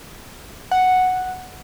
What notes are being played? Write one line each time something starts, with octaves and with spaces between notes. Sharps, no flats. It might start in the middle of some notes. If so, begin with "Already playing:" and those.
F#5